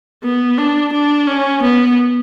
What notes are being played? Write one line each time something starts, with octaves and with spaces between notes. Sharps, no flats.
B3
D4
D4
C#4
B3